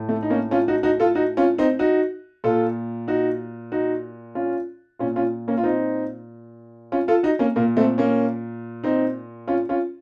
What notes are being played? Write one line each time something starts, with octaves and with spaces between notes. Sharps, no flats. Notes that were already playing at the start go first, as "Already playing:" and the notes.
Already playing: A2
A3
D#4
A#3 C#4
C#4 F4
D#4 F#4
D#4 F#4
F4 A4
D#4 F#4
C#4 F4
C4 D#4
D#4 F#4
A#2 F4 A4
D#4 F#4
D#4 F#4
C#4 F4
A#2 C#4 F4
C#4 F4
A#3 C#4
F4
C4 D#4
C#4 F4
F4 A4
D#4 F#4
A#3 C#4
A#2 A#3
A3 C4
A#3 C#4
C4 D#4
C#4 F4
C#4 F4